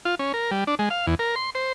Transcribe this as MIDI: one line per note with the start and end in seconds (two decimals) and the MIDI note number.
0.05 0.15 65
0.19 0.32 61
0.34 0.51 70
0.51 0.64 55
0.67 0.75 62
0.79 0.89 56
0.90 1.06 77
1.07 1.15 40
1.19 1.35 70
1.36 1.50 84
1.55 1.73 72